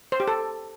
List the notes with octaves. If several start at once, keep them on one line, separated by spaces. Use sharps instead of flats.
C5
G4
A4